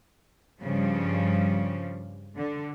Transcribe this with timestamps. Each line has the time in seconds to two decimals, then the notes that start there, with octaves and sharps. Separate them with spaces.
0.60 G2 C#3 F3 G3
2.37 D3